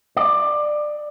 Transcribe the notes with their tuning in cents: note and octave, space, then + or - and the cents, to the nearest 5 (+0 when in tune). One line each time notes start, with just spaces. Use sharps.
D5 +20